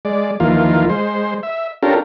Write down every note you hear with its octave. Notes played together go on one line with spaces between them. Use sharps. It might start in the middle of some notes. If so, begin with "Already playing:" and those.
G#3 D5
D#2 E3 F3 A#3 F4
G#3 C5
E5
C#4 D4 F4 G4 A4 A#4